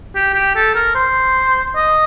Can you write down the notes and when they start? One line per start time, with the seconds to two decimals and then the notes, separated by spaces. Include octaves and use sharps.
0.15 G4
0.34 G4
0.56 A4
0.75 A#4
0.95 C5
1.76 D#5